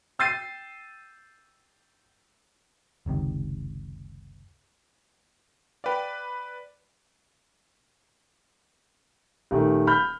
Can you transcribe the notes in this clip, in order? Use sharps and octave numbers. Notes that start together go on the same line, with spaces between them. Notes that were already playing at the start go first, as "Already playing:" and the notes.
G5 E6 G6 A6 C7 D#7
F#1 C#2 C3 D#3
B4 D5 F5 G5
D#1 D#3 A3
B5 F6 G6